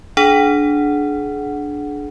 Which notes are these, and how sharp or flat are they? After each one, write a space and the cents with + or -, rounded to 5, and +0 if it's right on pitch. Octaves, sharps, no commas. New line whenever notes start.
D4 +0 G#4 +35 F#5 +0